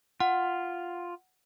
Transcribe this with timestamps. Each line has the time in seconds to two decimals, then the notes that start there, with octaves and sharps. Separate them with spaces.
0.20 F4 F#5